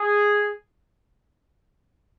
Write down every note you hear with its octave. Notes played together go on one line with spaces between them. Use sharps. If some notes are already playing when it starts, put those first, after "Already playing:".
Already playing: G#4